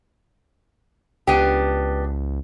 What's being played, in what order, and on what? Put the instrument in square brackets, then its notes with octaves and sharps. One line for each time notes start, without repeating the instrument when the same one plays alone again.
[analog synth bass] C#2 [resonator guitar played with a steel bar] B3 D4 G4